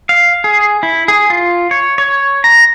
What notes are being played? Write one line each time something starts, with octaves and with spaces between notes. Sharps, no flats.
F5
G#4
E4
G#4
F4
C#5
C#5
A#5